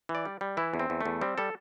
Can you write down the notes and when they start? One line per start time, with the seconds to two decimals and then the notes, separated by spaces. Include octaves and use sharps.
0.09 E3
0.15 D5
0.25 G3
0.41 G3
0.57 E3 E4
0.74 E2
0.79 C4
0.90 E2
1.01 E2 A3
1.21 G3 C4
1.38 G3 A4